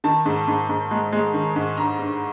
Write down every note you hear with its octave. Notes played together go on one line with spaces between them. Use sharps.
D#3 A5
G#2
G#2
G#2
G#3
G#3
D#3
G#2
G2 A#5
G2